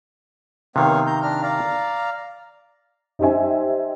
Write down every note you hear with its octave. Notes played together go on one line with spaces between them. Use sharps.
C3 D#3 B3 C#5 F5
A#5 G6
D4 A#5 F6
D5 F5 A#5
D#4 G4 C5 E5 G#5